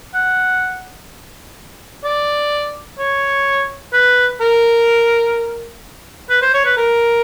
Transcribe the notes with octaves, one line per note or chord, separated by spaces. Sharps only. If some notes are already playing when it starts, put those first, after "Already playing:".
F#5
D5
C#5
B4
A#4
B4
C5
C#5
B4
A#4